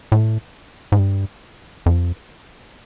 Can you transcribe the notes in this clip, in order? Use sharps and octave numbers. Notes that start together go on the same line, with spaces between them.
A2
G#2
G2
F2